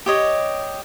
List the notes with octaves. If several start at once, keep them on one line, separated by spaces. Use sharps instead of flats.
G4 C#5 D#5